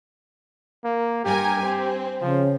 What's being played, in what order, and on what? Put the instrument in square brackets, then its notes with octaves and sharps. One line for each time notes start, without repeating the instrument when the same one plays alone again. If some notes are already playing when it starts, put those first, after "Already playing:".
[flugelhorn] A#3
[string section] G2 A#4 G#5 [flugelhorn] G4
[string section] C4
[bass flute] C#3 [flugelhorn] F3